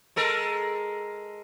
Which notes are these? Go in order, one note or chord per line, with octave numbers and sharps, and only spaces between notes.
G#3 A4 A#4